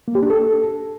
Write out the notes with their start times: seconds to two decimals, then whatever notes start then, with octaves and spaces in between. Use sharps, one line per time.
0.08 A#3
0.15 G4
0.23 D4
0.30 A4